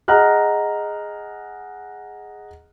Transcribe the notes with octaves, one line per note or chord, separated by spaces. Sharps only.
G#4 D#5 F#5 A#5 F6 F#6